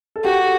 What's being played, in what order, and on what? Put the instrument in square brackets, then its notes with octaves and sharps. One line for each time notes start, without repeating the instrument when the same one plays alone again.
[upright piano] A4
[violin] F#4 [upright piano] G4